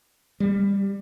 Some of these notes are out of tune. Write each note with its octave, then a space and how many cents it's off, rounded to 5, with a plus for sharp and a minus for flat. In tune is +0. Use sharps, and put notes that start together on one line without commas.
G3 +20